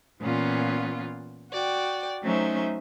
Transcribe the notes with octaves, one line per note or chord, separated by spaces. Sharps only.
A#2 E3 B3 C#4 F4
F#4 D5 G5
F#3 A3 C#4 D#4 C5 E5